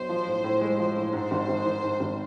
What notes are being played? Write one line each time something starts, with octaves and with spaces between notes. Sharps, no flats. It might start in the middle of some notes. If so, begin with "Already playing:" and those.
Already playing: B1 C5
F3
A2
A2
G#3
F3
A2
G#2 C5
G#1
G#1
D#3
G#2
G#1